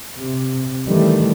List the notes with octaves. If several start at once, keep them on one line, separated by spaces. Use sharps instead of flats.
C3
D#3 E3 G3 A3